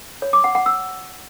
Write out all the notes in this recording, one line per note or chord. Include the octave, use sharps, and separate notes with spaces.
C#5
D6
F#5
F#5
E6